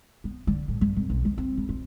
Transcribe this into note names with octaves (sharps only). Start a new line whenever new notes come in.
B3
D3
A2
G2
C2
B1
D#3
C4
C#2
F2